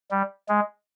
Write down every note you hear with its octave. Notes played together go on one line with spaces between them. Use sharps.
G3
G#3